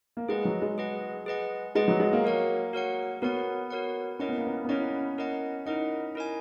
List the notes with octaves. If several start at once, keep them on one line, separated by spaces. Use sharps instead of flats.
A#3
G#3 G#4 B4 D#5 F#5
F#3
G#3
G#4 B4 D#5 F#5
G#4 B4 D#5 F#5
G#3 G#4 B4 D#5 F#5
F#3
G#3
A#3
F#4 A#4 C#5 F#5
F#4 A#4 C#5 F#5
B3 F#4 A#4 C#5 F#5
F#4 A#4 C#5 F#5
C#4 E4 A#4 D#5 F#5
B3
A#3
B3
B3
C#4 E4 A#4 D#5 F#5
E4 A#4 D#5 F#5
D#4 E4 A#4 D#5 F#5
E4 A#4 D#5 G#5